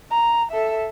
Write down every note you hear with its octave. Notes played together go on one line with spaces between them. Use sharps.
A#5
A4 E5